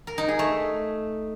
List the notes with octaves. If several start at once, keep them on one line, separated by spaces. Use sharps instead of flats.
A#4
D#4
G#4
A3